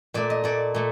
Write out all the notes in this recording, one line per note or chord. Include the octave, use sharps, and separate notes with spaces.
A#2 A3 D5
D#5
A#2 A3 D5
A#2 A3